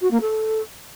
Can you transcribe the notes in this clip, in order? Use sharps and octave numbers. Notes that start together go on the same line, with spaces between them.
F#4
A#3
A4